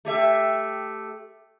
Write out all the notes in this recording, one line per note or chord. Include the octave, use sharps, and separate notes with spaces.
A3 G4 E5